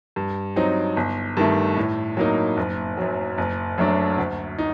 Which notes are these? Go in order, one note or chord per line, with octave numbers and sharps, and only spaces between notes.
G2
F#3 C4 D#4
G1
G2 D#3 A3
A2
F#3 A#3 D#4
F#1
F#2 F#3
F#1
F#2 F#3 A3 D4
D2
D#4